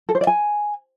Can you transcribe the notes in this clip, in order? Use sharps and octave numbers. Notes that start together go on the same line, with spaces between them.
A4
C5
D5
G#5